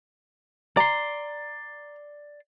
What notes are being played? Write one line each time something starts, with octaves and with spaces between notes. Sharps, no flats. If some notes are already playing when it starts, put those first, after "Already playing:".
D5 A#5 C6